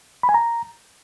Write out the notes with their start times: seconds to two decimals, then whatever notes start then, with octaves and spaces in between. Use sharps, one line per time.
0.23 B5
0.29 G#5
0.34 A#5